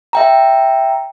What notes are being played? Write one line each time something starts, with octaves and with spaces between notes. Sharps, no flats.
E5 G5 A#5